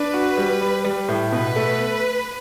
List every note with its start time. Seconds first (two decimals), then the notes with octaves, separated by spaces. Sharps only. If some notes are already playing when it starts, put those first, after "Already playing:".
Already playing: D4 B4
0.14 F#4
0.37 G3
0.61 G3
0.84 G3
1.08 A2
1.32 B2 B4
1.56 A3